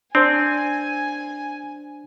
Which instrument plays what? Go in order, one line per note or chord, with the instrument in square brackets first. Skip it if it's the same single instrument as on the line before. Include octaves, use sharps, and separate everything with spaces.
[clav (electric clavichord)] C4 [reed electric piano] D4 C5 [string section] G#5